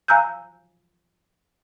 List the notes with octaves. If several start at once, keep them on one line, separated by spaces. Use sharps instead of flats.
F5 G#5 A#5 E6 F#6 G6